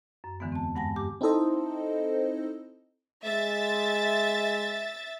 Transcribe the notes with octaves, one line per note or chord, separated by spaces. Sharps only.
F#2
E2 D3 E3 G#3 B3
C4 A5
G2 G#3 F#5 G#5 A5 A#6
G4 D6
C4 D#4 E4 A4 C5 D#5
G#3 E5 A6